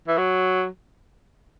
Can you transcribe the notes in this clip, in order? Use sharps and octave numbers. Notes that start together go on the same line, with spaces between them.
E3
F#3